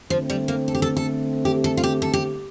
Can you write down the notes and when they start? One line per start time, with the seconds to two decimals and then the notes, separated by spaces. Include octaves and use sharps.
0.10 D3 F3 A3 C4
0.30 G3
0.48 A#3
0.68 A4
0.75 G4
0.82 A4
0.97 A4
1.45 G4
1.64 A4
1.77 F4
1.84 G4
2.02 A4
2.13 G4